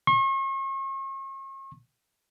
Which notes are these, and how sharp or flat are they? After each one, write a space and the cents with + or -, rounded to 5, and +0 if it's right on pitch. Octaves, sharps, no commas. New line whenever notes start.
C#6 -40